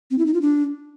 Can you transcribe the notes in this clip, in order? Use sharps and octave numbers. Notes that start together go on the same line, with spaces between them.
C4
E4
D#4
F4
D4